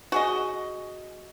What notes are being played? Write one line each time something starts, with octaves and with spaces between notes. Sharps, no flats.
F#4 G#4 D#5